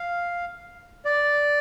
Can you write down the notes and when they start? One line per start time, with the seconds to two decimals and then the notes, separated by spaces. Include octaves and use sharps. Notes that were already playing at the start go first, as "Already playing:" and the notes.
Already playing: F5
1.05 D5